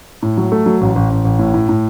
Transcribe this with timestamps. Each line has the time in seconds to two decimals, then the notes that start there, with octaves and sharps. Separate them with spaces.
0.22 A2
0.37 F#3
0.52 A3
0.66 F#3
0.81 A1
0.95 A1
1.10 A1
1.24 A1
1.39 A2
1.54 A2
1.69 A2